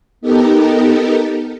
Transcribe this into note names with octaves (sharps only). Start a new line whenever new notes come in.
B3 D#4 G4 A4 A#4